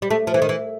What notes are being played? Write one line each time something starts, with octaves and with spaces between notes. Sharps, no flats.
G3
A3
F3
E3
D#3
E3